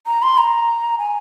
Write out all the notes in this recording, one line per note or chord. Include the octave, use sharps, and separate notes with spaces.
A#5
C6
A#5
G#5